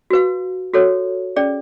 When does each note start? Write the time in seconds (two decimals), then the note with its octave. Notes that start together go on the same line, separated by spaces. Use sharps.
0.11 F#4 B4 F5
0.74 F#4 A4 C#5
1.36 C#4 G#4 D5